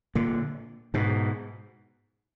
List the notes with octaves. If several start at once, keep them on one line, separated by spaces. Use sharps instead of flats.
A#2 D3
G#2 B2